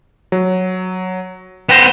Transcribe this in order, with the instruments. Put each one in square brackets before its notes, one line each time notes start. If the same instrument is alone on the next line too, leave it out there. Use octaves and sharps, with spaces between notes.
[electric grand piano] F#3
[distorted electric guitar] B3 C5 [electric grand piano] G5 A#6